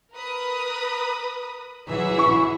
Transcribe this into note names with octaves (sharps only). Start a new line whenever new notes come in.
A#4 B4 D#6
E3 F#3 G#4 E5 F#5
E4 C#6